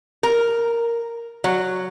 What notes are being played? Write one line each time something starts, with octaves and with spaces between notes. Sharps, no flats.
A#4
F#3